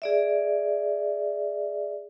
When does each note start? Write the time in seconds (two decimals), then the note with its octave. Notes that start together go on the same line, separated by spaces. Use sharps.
0.02 G#4 D5 E5